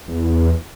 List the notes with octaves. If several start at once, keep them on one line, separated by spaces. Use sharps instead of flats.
E2